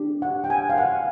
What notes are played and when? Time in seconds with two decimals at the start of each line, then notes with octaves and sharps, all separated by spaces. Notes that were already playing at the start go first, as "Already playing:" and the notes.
Already playing: D4 G4
0.22 F#5
0.44 G5
0.50 G#5
0.70 F5
0.78 F#5